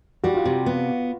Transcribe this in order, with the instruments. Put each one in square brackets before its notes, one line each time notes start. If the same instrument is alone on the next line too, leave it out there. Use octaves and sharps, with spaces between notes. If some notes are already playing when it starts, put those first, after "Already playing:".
[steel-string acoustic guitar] G3 [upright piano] F#4
[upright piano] F4
[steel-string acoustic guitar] C3 [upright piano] F#4
[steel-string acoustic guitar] B3